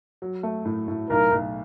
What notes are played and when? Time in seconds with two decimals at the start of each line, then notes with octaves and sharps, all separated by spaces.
0.22 F#3
0.43 A3
0.65 A2
0.88 A2
1.10 B1 A#4
1.32 B1